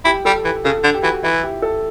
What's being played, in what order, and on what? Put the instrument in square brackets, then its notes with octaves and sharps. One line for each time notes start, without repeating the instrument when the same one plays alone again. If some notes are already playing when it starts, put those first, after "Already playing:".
[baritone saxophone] E4 [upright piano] G4
[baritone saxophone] G3 [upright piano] A4
[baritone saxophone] E3 [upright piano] G4
[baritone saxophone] C#3 [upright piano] A4
[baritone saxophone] D3
[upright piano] G4
[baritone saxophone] E3 [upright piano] F#4
[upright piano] G4
[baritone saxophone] E3 [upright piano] E4
[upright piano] G4
A4